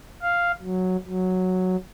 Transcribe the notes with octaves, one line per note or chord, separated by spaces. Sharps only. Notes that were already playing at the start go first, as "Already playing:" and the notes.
F5
F#3
F#3